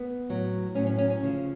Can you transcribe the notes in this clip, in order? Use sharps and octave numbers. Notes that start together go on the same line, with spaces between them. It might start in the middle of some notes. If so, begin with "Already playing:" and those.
Already playing: B3
A2 F#3
A2 F#3 C#4
C#4
C#4
C#4
D2 C#3 F3